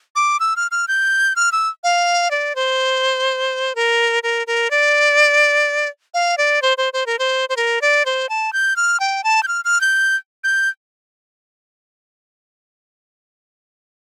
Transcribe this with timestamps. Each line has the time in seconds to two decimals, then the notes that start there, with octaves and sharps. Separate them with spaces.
0.16 D6
0.40 E6
0.56 F6
0.71 F6
0.88 G6
1.36 F6
1.52 E6
1.84 F5
2.31 D5
2.55 C5
3.75 A#4
4.23 A#4
4.47 A#4
4.71 D5
6.14 F5
6.38 D5
6.62 C5
6.78 C5
6.93 C5
7.06 A#4
7.19 C5
7.49 C5
7.57 A#4
7.81 D5
8.06 C5
8.29 A5
8.53 G6
8.76 F6
9.00 G5
9.24 A5
9.43 G6
9.48 F6
9.65 F6
9.81 G6
10.44 G6